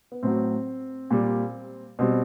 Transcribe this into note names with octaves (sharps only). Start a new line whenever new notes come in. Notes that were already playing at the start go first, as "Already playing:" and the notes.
B3
A2 F#3 C4
A#2 G3
B2 G3 C4